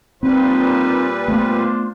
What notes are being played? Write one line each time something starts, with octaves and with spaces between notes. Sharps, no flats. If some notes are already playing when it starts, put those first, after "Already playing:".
A#2 G3 C4 D#4 F4 B4 C5
A3 B3 D4 F4 C5